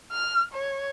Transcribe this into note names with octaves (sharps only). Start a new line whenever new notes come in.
F6
C#5